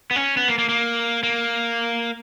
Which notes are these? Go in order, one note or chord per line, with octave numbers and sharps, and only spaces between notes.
B3
C#4
B3
A#3
A#3
A#3
A#3